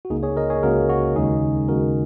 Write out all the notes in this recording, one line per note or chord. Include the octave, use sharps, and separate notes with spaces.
F#4
C#2 C#3 A#3 D#4 G#4
G#4 C#5
A#4 D#5
G#4 C#5
C#2 C#3 A#3 F#4 A#4
F#4
D#2 C#3 G#3 D#4 G#4
D#2 C#3 G#3 F#4 A#4